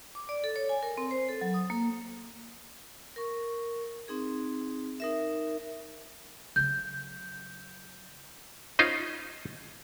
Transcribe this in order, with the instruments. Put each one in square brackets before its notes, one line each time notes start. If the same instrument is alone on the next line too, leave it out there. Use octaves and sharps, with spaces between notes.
[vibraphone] D6
D5
A4
C#5
G#5
A#4
C4
C5
A4
F#3
D#6
A#3
A#4 C#6
C4 D#4 G#4
D#4 A#4 E5
[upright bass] C#3 F#3 [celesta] G6
[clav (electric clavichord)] C#4 D#4 F4 C5